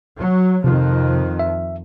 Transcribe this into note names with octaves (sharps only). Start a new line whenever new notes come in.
F#3
F2 C3 D#3 F3
E5